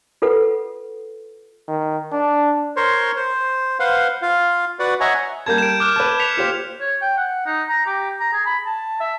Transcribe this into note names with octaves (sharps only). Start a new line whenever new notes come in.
F4 A4 B4 F#5
D#3
D4
A#4 C5 C#5 C6
C5
B4 C5 F5 F#5 C6
F4 F5
F#4 B4 D5 F#5
C#5 D#5 E5 F#5 G#5 A#5
G3 A#3 A5 G6 G#6
D7 E7
D6 F6 F#6
B4 A5
B6 C#7 F7
F4 G4 C5
C#5
G5
F#5
D#4
A#5
G4
A#5
G#4
B5
A5
E5